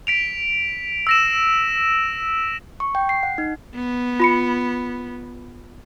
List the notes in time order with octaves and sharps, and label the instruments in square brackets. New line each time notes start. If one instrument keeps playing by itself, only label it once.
[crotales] B6 D7 F7
E6 A#6 E7
[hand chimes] C#6
G5
C7
F#5
D#4
[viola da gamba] B3
[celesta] F4 B5 C#7